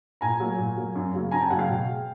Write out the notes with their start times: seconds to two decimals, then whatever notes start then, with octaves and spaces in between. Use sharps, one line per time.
0.21 A#2 G#5 A#5
0.40 F#3 A#3
0.58 A#2
0.77 F#3 A#3
0.95 F#2
1.14 C#3 F#3 A#3
1.31 F#2 G#5 A#5
1.41 G5 A5
1.50 C#3 F#3 A#3 F#5 G#5
1.59 F5 G5
1.69 B2
1.87 G#3